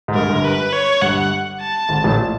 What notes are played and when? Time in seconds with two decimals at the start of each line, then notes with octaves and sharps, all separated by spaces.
0.08 G#2
0.15 G1 G2 A#4
0.30 G1 G2
0.44 B4
0.72 C#5
1.02 G1 G2 F#5
1.61 A5
1.89 G#1 G#2
2.04 A1 A2
2.18 A#2